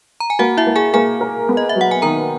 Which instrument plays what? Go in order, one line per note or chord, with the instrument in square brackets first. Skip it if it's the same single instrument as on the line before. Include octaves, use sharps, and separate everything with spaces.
[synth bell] A#5
G#5
[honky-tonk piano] A#3 [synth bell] F#4 F#5
[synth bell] E4 E5
[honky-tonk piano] A#3
[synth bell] G#4 G#5
[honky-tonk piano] A#3 [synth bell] G#4 G#5
[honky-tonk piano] A#4
B3
[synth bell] D#5
E5
[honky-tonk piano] F#3
[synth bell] F#5
G#5
[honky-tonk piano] D#3 [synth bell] A#4 A#5